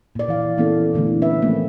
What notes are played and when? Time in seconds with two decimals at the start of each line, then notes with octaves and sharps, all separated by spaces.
0.15 A#2 D5
0.29 E3 F5
0.58 E3 A#3 B3 C#4 E4 A4
0.94 A#2 D3 E3 A3 D4
1.22 C#4 B4 E5
1.42 F3 A3 A#3 C4